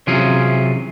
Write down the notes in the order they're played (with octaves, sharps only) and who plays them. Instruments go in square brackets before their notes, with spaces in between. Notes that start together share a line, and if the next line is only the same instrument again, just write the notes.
[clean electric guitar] C3 E3 F#3 C#4 F4 G#4